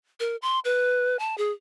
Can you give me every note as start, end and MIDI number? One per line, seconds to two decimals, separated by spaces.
0.20 0.36 70
0.42 0.59 84
0.65 1.17 71
1.19 1.37 81
1.38 1.52 68